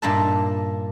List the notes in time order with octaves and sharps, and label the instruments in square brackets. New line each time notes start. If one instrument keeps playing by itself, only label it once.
[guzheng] G2 A#2 A#3 D#4 E5 A5